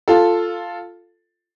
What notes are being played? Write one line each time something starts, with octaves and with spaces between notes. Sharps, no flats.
F4 A4